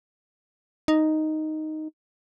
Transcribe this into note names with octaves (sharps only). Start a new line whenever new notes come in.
D#4